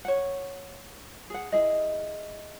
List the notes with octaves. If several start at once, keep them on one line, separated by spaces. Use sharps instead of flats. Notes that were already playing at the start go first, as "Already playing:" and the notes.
C#5 F#5
G#4 F#5
E4 G#4 D#5